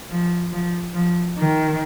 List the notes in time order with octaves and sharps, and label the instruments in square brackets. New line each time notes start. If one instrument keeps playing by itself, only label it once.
[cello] F3
F3
F3
D#3